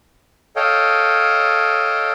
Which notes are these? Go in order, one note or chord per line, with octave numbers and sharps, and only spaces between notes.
A4 C#5 D#5 F5 G5